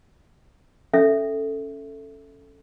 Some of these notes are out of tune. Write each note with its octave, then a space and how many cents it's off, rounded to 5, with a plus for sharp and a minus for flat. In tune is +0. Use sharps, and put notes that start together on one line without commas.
C#4 +0 A4 +0 E5 +0